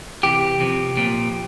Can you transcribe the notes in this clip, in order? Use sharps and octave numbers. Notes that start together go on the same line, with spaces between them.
C3 E3 G4
C3 F3
A#2 F3